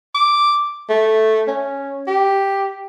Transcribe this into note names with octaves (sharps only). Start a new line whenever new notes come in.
D6
A3
C#4
G4